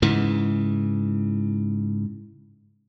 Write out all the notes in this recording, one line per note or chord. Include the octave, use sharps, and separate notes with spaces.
G#2 C#3 E3